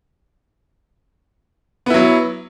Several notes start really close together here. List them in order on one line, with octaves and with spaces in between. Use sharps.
B3 E4 F#3